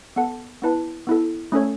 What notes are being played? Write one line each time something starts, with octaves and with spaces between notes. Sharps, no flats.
B3 A4 F#5 A5
B3 E4 B4 A5
B3 E4 A4
A3 C#4 A4 C#5